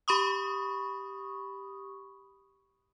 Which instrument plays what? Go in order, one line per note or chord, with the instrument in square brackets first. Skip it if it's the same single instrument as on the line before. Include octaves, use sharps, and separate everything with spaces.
[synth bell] G4 B5 C#6 D#6